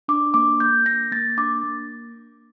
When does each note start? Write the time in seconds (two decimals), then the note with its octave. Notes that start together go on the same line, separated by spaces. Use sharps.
0.08 D4 D6
0.34 A#3 D6
0.60 A#3 G6
0.86 A#3 A#6
1.12 A#3 A6
1.37 D4 D6
1.64 A#3